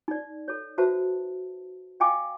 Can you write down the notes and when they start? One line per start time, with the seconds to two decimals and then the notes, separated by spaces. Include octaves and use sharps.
0.08 D#4 D5
0.48 A4 C#5
0.78 F#4 B4 C5 E5 A5
2.00 D#5 F5 G5 G#5 D6